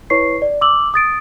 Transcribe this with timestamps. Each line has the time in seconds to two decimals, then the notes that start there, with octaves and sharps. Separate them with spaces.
0.10 E4 B4 C#5 C#6 C7
0.42 D5
0.61 D6 E6 F#7
0.94 D#6 A6 D7